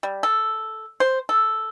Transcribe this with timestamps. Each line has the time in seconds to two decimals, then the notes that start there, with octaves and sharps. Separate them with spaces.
0.03 G3
0.23 A4
1.00 C5
1.29 A4